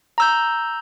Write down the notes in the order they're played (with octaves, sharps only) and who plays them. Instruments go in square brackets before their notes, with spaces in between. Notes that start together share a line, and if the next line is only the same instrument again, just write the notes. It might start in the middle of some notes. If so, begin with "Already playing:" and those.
[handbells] A#5 E6 G6